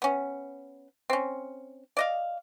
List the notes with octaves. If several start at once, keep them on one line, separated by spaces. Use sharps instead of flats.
B3 C#4
C4 C#4
D5 D#5 F5